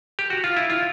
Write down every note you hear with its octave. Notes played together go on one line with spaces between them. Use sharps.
G4
F#4
F4
E4
F4